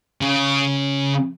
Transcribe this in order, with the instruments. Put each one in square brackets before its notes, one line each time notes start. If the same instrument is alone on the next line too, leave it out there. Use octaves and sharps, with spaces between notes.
[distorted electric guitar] C#3